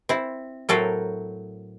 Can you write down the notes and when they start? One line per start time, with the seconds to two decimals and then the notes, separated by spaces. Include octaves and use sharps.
0.09 C4 E4
0.69 A2 F#3 A4 A#4 C5